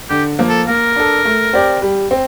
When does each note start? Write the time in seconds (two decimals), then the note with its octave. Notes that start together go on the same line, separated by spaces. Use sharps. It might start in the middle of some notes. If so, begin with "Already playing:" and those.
0.10 D3 G4
0.39 F3 A#3
0.49 A4
0.68 A#3 A#4
0.96 D4 A4
1.25 A3
1.53 C4 G4 D5
1.82 G3
2.11 C4